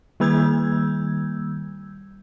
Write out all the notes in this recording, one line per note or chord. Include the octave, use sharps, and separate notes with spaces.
D#3 G3 A#3 E6 G6 G#6